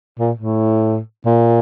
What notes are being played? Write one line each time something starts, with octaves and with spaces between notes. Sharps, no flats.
A#2
A2
A#2